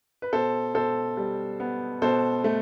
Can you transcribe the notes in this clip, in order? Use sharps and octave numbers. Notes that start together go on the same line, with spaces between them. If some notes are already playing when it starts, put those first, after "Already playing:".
B4
B2 A4 C5
B2 A4 C5
G3
B3
B2 A4 C5
A3